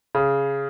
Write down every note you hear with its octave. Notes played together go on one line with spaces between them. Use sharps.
C#3